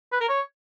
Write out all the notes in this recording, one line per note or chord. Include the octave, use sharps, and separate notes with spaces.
B4
A#4
C#5